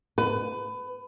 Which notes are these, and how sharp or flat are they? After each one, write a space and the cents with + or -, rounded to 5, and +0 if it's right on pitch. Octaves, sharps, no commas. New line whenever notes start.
B4 +25